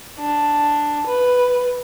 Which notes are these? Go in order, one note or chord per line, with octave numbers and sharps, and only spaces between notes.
D4
B4